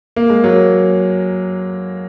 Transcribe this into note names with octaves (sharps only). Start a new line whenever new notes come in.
A#3
G#3
F#3 A#3